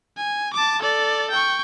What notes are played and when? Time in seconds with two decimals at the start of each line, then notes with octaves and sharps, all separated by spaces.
0.17 G#5
0.54 A5 D6
0.82 A4 D5
1.31 G5 C#6